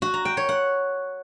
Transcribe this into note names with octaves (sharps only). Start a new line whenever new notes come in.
F#4
A#5
G5
C#5
F#5